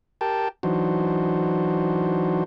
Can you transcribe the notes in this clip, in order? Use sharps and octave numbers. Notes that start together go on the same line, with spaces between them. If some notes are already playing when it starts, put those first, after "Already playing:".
G4 A#4 G5 A5
E3 F#3 D4 D#4 F#4 C5